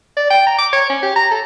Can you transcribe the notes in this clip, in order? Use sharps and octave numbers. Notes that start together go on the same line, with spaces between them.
D5
G5
A#5
D6
C#5
C#4
G4
A#5
A4